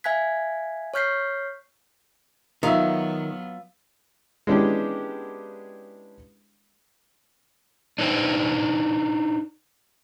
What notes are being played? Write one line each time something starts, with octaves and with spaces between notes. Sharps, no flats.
E5 F5 G#5 F#6 G#6 B6
C#5 C#6 F6 G6 B6 C7
D#3 F#3 B3 F4 E5
G#3 B3 C#4 D4 E4 G4
D4 D#4 B4 C5 G5